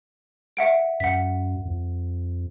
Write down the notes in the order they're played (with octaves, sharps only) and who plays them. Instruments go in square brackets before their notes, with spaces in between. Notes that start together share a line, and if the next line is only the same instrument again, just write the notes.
[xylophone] E5 F#5 D7
[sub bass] F#2 [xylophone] F#5 B6
[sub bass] F2